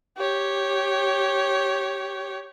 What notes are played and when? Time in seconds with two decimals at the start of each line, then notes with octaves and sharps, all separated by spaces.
0.18 G4 C#5